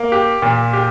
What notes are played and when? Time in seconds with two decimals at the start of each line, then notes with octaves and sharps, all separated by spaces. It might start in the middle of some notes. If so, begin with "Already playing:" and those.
Already playing: A#3
0.12 G4
0.42 A#2
0.73 G4